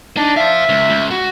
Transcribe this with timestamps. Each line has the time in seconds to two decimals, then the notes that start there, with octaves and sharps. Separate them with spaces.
0.17 D4 D#4
0.37 C5 E5 F5
0.69 C#2
0.90 C#2
1.11 F#4